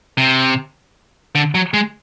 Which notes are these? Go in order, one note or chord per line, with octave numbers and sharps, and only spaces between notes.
C3
D3
F#3
G#3